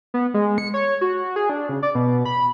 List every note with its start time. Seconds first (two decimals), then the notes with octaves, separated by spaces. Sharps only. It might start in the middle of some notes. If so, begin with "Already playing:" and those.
0.14 B3
0.34 G#3
0.58 C#7
0.74 C#5
1.01 F#4
1.36 G#4
1.50 D4
1.69 C#3
1.83 D5
1.95 B2
2.25 B5